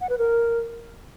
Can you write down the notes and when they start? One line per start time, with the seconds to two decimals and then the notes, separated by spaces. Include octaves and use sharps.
0.01 F#5
0.09 B4
0.18 A#4